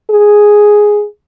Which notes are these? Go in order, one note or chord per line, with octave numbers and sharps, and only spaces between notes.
G#4